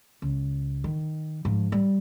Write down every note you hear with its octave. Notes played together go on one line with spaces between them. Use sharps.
C#2
D#3
G#2 F3
G3